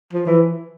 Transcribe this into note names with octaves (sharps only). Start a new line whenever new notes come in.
F3
E3